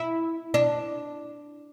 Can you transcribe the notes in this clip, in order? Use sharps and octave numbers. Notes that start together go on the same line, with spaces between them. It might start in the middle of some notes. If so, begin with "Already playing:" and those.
Already playing: E4
D4